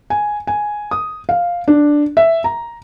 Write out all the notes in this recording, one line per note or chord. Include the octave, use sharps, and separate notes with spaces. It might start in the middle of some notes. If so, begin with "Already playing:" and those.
G#5
G#5
D#6
F5
D4
E5
A#5